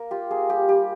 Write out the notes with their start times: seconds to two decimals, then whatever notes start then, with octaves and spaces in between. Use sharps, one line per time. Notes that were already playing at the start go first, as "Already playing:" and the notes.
Already playing: A#3 A#4
0.11 F4 G4
0.31 A#3 G#4
0.49 G3 G4
0.68 G3 G4